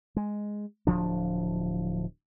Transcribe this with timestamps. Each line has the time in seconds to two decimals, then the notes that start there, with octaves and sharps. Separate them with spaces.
0.16 G#3
0.87 D1 F3 D4